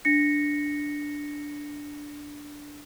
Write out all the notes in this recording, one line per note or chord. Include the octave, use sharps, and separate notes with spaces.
D4 A#6 C#7